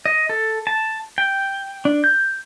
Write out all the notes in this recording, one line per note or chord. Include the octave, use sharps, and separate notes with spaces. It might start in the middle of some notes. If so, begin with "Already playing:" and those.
D#5
A4
A5
G5
D4
G6